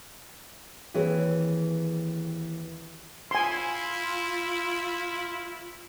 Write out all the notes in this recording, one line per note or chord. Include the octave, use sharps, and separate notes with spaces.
D#2 E3 C4 G#4 C#5
E4 F4 G#5 C6